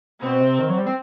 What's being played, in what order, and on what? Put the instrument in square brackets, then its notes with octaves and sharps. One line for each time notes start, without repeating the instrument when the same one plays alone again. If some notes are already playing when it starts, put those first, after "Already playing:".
[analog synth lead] B2 [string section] C4
[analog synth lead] C3
D#3
F#3
G3
C4